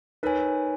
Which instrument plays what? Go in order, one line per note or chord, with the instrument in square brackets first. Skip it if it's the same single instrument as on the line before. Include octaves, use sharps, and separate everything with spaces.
[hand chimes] D#4 A#4 C#5 G#5 [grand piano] B4